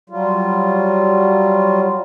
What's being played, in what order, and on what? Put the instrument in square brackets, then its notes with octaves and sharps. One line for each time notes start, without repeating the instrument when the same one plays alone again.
[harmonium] F#3 G3 F4